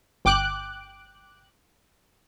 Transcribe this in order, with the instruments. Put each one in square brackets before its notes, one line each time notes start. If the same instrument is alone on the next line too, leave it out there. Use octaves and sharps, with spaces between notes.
[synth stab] G1 G5 D6 F#6 D7